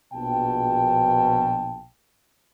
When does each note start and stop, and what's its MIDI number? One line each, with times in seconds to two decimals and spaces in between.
0.14 1.86 34
0.14 1.86 47
0.14 1.86 79
0.14 1.86 81